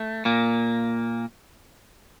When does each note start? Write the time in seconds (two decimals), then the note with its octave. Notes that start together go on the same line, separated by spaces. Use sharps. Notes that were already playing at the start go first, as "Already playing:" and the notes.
Already playing: A3
0.25 A#2 A#3